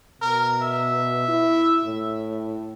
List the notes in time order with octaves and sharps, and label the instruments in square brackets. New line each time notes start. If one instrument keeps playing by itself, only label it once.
[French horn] B2 [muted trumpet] A#4
[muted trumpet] E5
[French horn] E4
A2